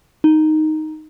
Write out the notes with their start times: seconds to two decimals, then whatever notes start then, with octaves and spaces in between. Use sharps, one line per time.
0.24 D#4